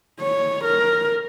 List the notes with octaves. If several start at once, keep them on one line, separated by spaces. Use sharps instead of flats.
C#5
A#4